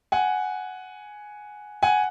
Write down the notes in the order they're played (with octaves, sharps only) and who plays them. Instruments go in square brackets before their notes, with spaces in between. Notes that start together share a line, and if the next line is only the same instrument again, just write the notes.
[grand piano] F#5 G#5
F#5 G#5